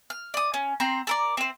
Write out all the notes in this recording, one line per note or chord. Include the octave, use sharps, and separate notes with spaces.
F6
D5 D#6
C#4
C4 A#5 C6
A4 A#4 D5
C4 C5